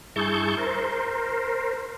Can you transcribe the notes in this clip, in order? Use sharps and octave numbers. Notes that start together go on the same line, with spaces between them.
G2 E4 G#4 A5 C#6 G6
A#4 C5